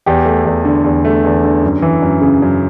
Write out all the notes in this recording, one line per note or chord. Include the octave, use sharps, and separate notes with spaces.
E2 G4
A3
E2
D3
E2
A3
E2
D3
F#2
E3
F#2
C#3
F#2